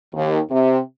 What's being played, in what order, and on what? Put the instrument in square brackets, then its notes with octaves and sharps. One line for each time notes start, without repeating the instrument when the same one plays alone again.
[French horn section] D#2
C3